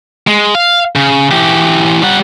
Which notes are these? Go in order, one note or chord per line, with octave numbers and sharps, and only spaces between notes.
G#3
F5
C#3
E3 G4
G3 F#5